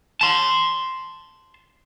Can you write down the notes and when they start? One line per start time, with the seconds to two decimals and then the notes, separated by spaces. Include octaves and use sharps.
0.21 A5 C6